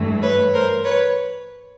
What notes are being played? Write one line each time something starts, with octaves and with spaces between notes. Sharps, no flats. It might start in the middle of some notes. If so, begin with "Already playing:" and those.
Already playing: G2 E3 A3
B4 C#5
A#4 C5
B4 C#5